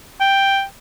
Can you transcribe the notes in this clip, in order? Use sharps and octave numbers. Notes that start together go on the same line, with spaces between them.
G5